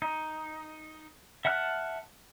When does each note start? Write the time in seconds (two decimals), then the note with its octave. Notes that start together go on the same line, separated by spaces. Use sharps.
0.02 D#4
1.45 E5 F#5 A5 F6 F#6